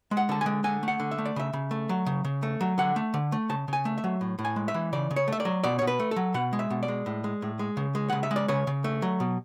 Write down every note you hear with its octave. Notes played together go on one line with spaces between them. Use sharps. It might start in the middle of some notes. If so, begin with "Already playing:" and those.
G#3
F#5
D3 A5
G#3 G#5
D3 G#5
A3 F#5
D3
E5
A3
D5
C#3 E5
C#3
A3
F#3
C#3
C#3
A3
F#3
D3 F#5
A3
D3
A3
C#3 A5
C#3 G#5
A3
E5
F#3
A2
A2
G#5
G#3
E5
E3
C#3 D5
C#3
C#5
A3 E5
D5
F#3
B2 D5
B2 C#5
B4
A3
A4
F#3
B2 F#5
G#3
E5
B2
D5
G#3
A2
G#3
A2
G#3
C#3
G#3
C#3 F#5
E5
G#3
D5
C#3 C#5
C#3
A3
F#3
B2